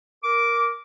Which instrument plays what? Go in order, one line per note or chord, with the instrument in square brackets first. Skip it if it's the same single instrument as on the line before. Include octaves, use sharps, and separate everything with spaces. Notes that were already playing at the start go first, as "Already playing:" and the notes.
[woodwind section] A#4 D6